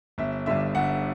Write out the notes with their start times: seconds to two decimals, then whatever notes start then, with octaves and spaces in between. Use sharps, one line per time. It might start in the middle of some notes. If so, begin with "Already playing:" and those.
0.18 G1 E5
0.46 G2 D3 E5
0.75 G1 F#5